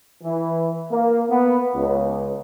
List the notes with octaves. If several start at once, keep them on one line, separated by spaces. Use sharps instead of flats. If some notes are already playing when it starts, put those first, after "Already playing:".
E3
A#3
B3
C#2